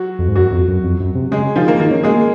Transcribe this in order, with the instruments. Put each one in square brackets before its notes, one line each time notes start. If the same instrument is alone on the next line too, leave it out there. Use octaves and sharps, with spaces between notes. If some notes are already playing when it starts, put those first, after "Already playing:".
Already playing: [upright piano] F#3 F#4
[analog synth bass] F2
G#2
[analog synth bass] F#2 [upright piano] F#3 F#4
[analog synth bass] F2
F#2
F2
F#2
C3
[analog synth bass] C#3 [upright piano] G#3 G#4
[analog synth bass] D#3 [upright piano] F3 F4
[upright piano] A#3 A#4
[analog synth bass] D#3 [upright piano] A#3 A#4
[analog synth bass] C#4
[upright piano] G#3 G#4 [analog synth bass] A#3
[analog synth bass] A#3